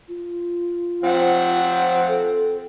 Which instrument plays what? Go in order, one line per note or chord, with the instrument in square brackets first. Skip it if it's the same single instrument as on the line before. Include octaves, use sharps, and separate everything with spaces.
[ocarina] F4
[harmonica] F3 F#5 [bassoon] C4
[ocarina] A4